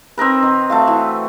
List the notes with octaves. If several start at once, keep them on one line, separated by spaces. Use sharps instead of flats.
C4 D#4 A#4 B4
D#3
A3 F#4 F5
E3